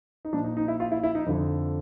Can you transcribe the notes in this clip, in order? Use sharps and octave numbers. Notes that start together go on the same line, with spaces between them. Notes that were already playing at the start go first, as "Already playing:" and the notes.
D#4
A#2 F3 D4
D#4
D#4
E4
F4
E4
E4
D#4
F2 D3 F3